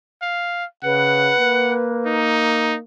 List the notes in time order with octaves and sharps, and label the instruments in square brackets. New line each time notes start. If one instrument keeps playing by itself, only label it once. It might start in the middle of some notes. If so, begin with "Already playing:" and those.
[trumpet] F5
[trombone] C#3 [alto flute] B4 [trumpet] F#5
[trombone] A#3
[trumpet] D#4